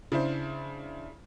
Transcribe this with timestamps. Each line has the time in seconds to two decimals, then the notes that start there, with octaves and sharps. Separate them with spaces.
0.12 C#3 D4 E4 C5